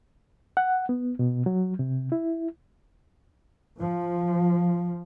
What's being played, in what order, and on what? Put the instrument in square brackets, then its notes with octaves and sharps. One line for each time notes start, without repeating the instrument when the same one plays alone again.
[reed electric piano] F#5
B3
B2
F#3
C3
E4
[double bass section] F3